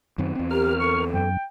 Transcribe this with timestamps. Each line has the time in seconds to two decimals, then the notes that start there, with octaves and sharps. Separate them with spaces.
0.18 F#2 D#3 C4
0.35 E2 C4
0.51 G4 A#4 F6
0.80 A4 C#6
1.14 F#2 G5